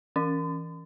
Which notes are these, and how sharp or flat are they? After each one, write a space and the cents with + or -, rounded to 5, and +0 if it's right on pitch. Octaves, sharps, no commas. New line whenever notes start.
E3 -10 C#4 +5